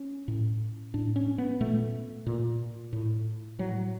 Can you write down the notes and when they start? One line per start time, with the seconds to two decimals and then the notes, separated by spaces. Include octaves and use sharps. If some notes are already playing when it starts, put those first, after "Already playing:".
Already playing: C#4
0.28 A2
0.94 A2 D4
1.16 C#4
1.38 B3
1.60 A#2 A3
2.26 A#2
2.93 A2
3.59 A2 F#3